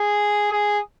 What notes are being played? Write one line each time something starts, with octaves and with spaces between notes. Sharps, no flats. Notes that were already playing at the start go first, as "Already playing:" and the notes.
Already playing: G#4
G#4